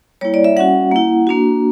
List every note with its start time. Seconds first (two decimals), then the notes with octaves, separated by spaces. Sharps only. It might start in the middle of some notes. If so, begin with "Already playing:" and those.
0.21 G3 A#3 E4 C#5
0.34 D5
0.44 E5
0.57 G3 C#4 F#4 F#5
0.92 A#3 E4
1.27 A#3 D4 F#4